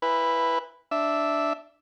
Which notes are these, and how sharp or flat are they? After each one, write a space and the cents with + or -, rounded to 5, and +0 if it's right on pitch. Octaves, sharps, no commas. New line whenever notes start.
E4 +10 B4 +0 G#5 -35
D4 +0 E5 +0